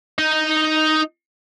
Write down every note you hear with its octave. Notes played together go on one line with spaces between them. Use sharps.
D#4